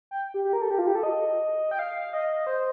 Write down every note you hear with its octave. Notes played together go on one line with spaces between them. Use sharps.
G5
G4
G4
A#4
A4
G4
F4
G4
A4
D#5
G5
F5
D#5
C5